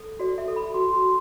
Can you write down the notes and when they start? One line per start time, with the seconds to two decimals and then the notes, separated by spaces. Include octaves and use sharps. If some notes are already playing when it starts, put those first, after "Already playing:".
Already playing: A4
0.19 F#4 D5
0.38 E5
0.48 A4
0.56 B5
0.74 F#4 C6
0.93 C6
1.02 F#4